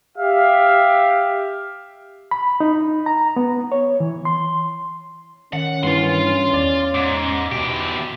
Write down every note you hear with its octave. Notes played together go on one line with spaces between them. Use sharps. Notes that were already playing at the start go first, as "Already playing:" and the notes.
G4 E5 F5
B5
D#4
A#5
B3
C#5
E3
C6
D#3 C#4 F#5
G2 E3 F5 C6
E2 D5
G#2 D6
E2 B2 G4